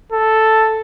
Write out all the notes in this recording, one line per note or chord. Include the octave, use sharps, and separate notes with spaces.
A4